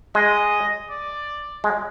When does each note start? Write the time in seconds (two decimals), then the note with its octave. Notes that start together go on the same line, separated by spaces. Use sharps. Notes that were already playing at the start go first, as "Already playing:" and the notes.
0.15 G#3 D#5
0.90 D5
1.64 G#3